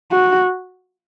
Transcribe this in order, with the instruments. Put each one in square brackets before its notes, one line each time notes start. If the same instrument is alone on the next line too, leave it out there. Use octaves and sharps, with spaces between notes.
[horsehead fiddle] F#4